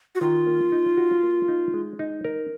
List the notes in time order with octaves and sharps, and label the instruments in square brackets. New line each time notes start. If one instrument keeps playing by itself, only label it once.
[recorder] F#4
[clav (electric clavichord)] D#3 [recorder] F4
[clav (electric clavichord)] A#3
D#4
F#4
A#3
D#4
G#3
D#4
A#4